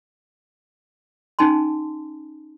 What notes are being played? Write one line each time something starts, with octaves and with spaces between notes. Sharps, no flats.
C#4 D#4 G#5 A5 C6